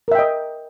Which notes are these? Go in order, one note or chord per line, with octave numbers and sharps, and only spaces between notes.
A#4 D#5 E5 G5